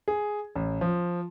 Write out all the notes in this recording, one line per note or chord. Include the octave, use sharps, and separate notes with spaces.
G#4
A1
F3